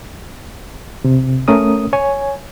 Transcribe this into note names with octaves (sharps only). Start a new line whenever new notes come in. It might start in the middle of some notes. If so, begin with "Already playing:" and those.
C3
A3 C#4 A#4 D#6
C#5 G#5